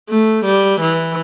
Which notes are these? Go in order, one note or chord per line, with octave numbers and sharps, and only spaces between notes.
A3
G3
E3